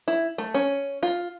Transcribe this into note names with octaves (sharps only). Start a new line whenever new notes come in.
E4
A3
C#4
F4